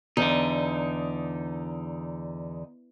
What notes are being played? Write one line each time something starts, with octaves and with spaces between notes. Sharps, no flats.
E2 D3 D#4